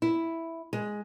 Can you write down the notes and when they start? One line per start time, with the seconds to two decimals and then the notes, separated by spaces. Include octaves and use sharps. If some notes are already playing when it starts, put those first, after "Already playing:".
0.02 E4
0.73 G#3